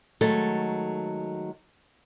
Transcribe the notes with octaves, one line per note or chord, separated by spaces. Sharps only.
D#3 F#3 G#3 A3 A4